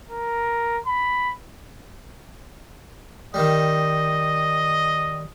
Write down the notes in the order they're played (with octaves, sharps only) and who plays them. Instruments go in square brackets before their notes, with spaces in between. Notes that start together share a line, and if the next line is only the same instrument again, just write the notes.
[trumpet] A#4
B5
[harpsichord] D#3 G3 [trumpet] D#5